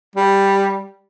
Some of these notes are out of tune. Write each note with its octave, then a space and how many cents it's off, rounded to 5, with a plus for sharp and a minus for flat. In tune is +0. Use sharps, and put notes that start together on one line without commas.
G3 +5